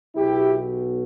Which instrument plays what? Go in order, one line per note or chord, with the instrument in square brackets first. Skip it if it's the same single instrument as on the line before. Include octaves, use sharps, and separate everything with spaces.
[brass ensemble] B1 B2 E4 G4